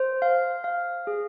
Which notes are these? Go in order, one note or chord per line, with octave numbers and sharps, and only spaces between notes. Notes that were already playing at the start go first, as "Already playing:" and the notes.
Already playing: C5
F5
F5
G#4